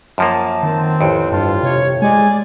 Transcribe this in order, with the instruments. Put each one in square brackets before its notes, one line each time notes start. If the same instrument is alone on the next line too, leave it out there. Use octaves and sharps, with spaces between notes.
[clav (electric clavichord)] F#2 F3 A#3 [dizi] A5
[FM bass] D#3 [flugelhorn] C4
[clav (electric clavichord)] A1 F2
[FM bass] G2 [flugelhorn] F4 [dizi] A5
[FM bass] C3 [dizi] C#5
[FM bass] G#3 [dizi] D5 [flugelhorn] G#5